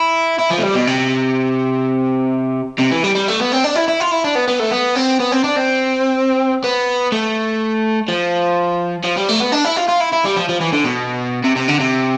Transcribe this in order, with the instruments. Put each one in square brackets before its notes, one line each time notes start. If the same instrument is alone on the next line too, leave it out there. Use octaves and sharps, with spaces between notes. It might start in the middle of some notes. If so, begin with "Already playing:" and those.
Already playing: [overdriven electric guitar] E4
E4
F3
A3
G3
B2
C3
C3
E3
G3
G3
A3
B3
C4
D4
E4
E4
F4
E4
D4
B3
B3
A3
B3
C4
B3
C4
D4
C4
B3
A3
F3
F3
G3
A3
B3
D4
E4
F4
F4
E4
E4
G3
F3
F3
E3
D3
B2
C3
C3
D3
C3